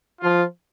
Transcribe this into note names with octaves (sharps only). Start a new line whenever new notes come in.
F3 F4